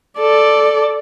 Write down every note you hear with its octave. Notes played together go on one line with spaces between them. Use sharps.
A4 D5